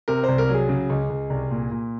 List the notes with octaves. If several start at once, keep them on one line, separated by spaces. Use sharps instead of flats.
C3 A#4
C2 C5
A#4
F#3
G#4
C#3
C#2
C#2
C2
A#2
A#2